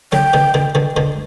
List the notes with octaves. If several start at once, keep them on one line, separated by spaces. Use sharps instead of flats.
D3 F#3 G5
B2 D3
B2 D3
B2 D3
B2 D3